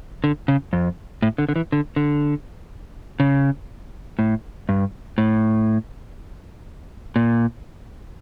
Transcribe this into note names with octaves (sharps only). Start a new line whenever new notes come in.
D3
C#3
F2
A2
D3
D3
E3
D3
D3
C#3
A2
G2
A2
A#2